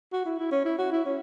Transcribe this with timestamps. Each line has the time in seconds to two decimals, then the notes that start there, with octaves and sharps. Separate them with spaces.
0.13 F#4
0.26 E4
0.39 E4
0.52 C#4
0.65 E4
0.78 F#4
0.92 E4
1.05 C#4